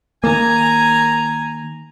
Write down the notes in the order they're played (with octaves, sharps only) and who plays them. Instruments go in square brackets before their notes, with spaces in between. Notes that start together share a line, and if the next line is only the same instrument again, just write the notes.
[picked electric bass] D#3 A#3 [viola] G#5 A#5